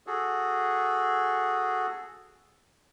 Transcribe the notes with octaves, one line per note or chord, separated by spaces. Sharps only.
F#4 G#4 A4